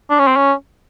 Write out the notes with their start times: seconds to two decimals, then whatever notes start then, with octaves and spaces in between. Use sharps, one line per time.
0.10 D4
0.19 C#4
0.27 C4
0.36 C#4